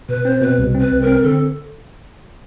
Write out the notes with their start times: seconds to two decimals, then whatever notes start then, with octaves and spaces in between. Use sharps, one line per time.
0.09 B2 B4
0.25 C4 C5
0.41 B2 B4
0.58 C2
0.75 C4
0.81 B4
0.91 C2
1.02 A#4
1.07 C4
1.24 D3 A4